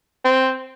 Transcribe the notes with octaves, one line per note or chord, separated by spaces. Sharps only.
C4